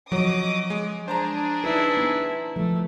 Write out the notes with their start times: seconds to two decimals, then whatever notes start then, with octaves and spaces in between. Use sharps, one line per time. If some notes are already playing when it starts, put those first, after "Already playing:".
0.12 F3 F#3 C#5 D#5 D6 D#6
0.70 G#3
1.08 D4 G#4 C5 A5 A#5
1.64 D#4 E4 B4
1.97 B3
2.56 F3 A3